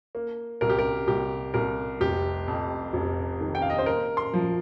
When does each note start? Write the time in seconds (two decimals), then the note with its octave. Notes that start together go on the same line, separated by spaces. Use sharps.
0.15 A#3
0.61 C2 A#4
0.70 G4
0.79 A#4
1.07 C2 G4
1.54 C2 A#4
2.00 F1 G4
2.48 F2
2.93 F1
3.41 D#3
3.55 G5
3.62 F5
3.70 D#5
3.78 C5
3.86 A#3 A#4
4.17 C6
4.33 F3